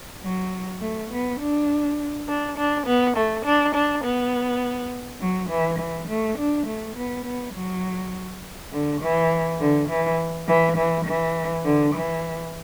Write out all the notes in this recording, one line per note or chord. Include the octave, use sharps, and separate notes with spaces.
F#3
A3
B3
D4
D4
D4
B3
A3
D4
D4
B3
F#3
E3
E3
A3
D4
A3
B3
B3
F#3
D3
E3
D3
E3
E3
E3
E3
D3
E3